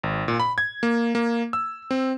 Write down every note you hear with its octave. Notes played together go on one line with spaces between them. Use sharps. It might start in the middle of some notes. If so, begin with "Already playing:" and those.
G#1
A#2
B5
G#6
A#3
A#3
E6
C4